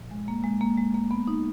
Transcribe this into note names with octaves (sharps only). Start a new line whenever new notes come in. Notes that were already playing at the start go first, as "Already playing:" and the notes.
Already playing: A#2 F3
G#3
A#3
G#3
A#3
G#3
A#3
B3
D#4